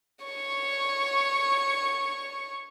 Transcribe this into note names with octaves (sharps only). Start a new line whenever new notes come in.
C#5 C#6